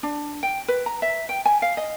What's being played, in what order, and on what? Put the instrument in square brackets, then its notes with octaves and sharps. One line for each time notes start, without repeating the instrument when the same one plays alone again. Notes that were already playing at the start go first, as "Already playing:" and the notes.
[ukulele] D4
G5
B4
A#5
E5
G5
G#5
F5
D#5